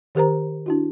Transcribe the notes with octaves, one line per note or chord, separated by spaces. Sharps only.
D#3 G4 A#4 C5 A#5
D4 E4 F#4